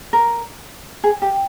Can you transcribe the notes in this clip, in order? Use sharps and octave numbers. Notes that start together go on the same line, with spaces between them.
A#4
G#4
G4